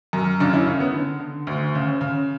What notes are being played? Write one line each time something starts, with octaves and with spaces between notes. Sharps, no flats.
F#2
C#3 D4
E4
C#3 C#4
B3
D3
D3
D2
C#3
C#3